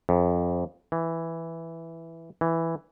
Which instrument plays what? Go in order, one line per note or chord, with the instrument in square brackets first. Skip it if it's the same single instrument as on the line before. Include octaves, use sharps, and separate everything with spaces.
[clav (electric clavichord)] F2
E3
E3